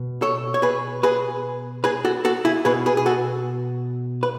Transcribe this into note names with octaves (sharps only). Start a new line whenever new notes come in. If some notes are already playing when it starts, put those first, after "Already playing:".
Already playing: B2
A4 C#5
C#5
G#4 B4
G#4 B4
G#4 B4
F#4 A4
F#4 A4
E4 G#4
B2 G#4 B4
G#4 B4
G#4
F#4 A4
B4